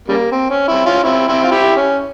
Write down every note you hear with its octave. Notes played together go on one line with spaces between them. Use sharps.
C#3 G3 A#3
C4
C#4
C4 E4
C#4 F4
C4 E4
C4 E4
F4
E4 G4
C#4